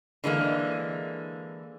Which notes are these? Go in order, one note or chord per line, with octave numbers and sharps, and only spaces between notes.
D3 E3 G#3 A#3